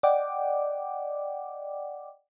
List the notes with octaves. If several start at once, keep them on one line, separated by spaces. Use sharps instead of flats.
D5 D#5 F#5 G5 D6